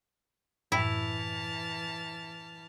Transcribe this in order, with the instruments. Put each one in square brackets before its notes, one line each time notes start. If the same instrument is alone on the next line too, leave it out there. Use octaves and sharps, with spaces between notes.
[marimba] F#2 A2 G5 [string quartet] E3 A5 F6 [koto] E4